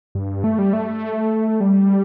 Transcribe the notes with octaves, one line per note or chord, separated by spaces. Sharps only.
G2
A3
G3
A3
G3